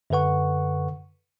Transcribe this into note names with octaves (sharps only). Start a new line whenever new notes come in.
F#2 D3 A4 B4 F#5 C#6